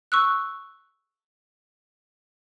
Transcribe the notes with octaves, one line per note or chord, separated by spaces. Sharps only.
C#6 E6 F#6